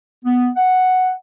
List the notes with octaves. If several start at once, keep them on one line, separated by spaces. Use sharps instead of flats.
B3
F#5